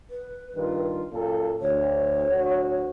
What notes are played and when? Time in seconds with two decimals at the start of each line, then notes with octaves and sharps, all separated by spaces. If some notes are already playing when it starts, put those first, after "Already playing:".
0.10 B4
0.55 G2 D#3 F4
1.12 F#2 A#2 A4 F5
1.61 D2 C#5
2.30 D2 F#4